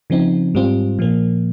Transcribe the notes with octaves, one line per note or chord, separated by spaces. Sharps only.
C#3 F3 C4 D#4
G#2 G3 C4 F4
A#2 F3 A#3